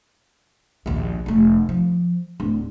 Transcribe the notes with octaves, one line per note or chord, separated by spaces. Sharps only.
A#1 D#2
F1 A3
F3
D1